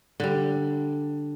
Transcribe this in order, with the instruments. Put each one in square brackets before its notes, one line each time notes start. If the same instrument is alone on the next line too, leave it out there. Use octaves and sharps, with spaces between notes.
[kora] D3 G3